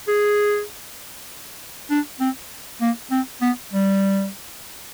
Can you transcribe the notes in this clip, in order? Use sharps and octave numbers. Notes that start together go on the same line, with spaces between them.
G#4
D4
C4
A#3
C4
B3
G3